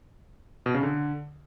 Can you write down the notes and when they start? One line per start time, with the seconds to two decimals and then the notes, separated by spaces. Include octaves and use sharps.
0.66 B2
0.74 C#3
0.83 D3